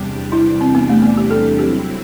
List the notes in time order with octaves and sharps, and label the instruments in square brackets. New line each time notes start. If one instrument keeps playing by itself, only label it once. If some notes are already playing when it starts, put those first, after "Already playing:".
Already playing: [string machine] E2 C3 G3 D4 G4
[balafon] E4
C4
B3
A3
B3
G4
A4
[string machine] F#3 C4 E4 [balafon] G4